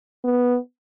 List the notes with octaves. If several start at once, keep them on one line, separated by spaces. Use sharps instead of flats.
B3